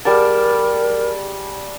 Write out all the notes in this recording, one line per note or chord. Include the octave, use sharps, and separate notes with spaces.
G3 G#4 A#4 A5